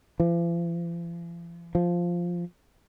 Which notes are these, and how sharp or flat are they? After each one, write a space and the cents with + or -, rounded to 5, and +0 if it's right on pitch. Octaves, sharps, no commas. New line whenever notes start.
F3 -45
F3 +0